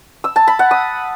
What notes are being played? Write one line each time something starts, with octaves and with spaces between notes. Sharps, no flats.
E6
A5
B5
F#5
D#6